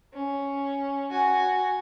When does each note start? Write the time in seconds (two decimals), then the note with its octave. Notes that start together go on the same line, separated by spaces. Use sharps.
0.13 C#4
1.11 F#4 G#5